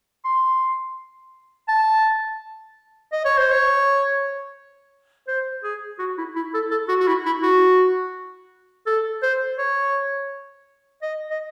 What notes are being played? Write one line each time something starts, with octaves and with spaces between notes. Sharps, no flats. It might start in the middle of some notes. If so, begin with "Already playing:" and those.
C6
A5
D#5
C#5
C5
C#5
C5
G#4
F#4
E4
E4
A4
A4
F#4
F#4
E4
E4
F#4
A4
C5
C#5
D#5
D#5